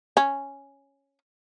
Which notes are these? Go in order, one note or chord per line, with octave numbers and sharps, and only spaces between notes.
C#4